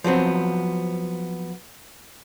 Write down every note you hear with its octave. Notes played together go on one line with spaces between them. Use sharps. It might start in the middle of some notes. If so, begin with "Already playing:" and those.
F3 F#3 B3 C4